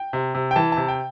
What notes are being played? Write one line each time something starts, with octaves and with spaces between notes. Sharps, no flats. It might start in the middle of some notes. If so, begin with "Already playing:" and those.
Already playing: G5
C3
C3
G5
E3 A5
C3 A5
G5